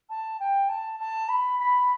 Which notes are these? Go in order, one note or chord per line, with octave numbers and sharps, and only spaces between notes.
A5
G5
A5
A5
B5
B5